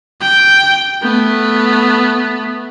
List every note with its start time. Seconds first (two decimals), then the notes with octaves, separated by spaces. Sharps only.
0.21 G5
1.02 A3 B3